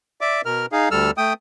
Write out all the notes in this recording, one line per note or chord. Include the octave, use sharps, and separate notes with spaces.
D5 E5 D6
B2 A#4 F6
D#4 G#4 F5
D2 G3 A4 E6 F6
A3 G5 D#6